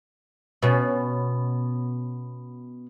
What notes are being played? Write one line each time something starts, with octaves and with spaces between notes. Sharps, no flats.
B2 C#4